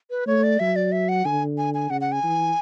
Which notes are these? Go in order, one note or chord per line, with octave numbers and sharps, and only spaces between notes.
B4
A3 C#5
D5
F#3 E5
D5
E5
F#5
D3 G#5
G#5
G#5
C#3 F#5
F#5
G#5
E3